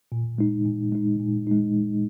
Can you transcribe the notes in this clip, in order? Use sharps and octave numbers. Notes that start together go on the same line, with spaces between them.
A#2
G#3 D#4
A#2
G#3 D#4
A#2
G#3 D#4